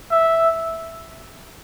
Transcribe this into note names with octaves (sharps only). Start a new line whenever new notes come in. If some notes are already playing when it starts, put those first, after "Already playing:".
E5